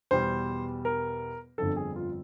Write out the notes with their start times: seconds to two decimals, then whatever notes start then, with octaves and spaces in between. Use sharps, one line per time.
0.11 E2 B2 G3 C5
0.85 A#4
1.58 G1 F2 D3 F3 A4
1.76 G#4
1.96 F4